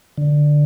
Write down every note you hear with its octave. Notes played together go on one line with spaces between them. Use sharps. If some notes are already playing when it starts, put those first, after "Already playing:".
D3